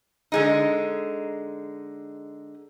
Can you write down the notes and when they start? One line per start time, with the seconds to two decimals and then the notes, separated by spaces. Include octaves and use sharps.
0.32 D3 G#3 D#4